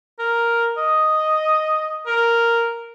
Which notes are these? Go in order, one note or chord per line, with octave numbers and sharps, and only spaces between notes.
A#4
D#5
A#4